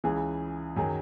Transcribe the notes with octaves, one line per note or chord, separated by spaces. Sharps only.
C#2 C#3 E3 G#4
F#2 D#3 F#3 G#4